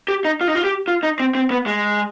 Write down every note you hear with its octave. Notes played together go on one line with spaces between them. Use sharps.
G4
D#4
F4
D#4
F4
G4
F4
D#4
C4
C4
B3
G#3